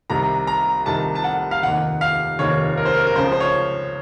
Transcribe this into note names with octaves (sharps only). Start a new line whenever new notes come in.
C2 C3 D#3 A#5
A#5
C2 C3 D#3 A5
A5
F#5
F5
F1 D#2 D#3 F#5
F5
F1 D#2 D#3 C#5
A#4
C5
A#4
A#4
C#2 C#3 F3 C5
C5
C#5